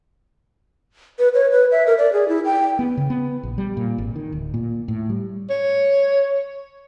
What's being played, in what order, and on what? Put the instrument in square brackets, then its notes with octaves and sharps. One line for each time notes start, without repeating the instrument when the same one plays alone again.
[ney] B4
C#5
B4
E5
A#4
D5
G#4
E4
G5
[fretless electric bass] B3
C#3
B3
A#1
G3
A#2
G#1
D#3
D1
A#2
A2
G3
[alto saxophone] C#5